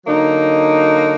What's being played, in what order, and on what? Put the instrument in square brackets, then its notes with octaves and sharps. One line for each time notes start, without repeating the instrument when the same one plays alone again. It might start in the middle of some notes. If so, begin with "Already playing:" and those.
[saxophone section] D3 F#3 A#3 D#4